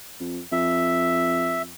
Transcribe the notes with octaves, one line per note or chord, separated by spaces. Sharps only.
F2
F2 E5